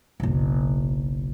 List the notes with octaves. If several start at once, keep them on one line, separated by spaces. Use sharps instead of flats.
F#1 B1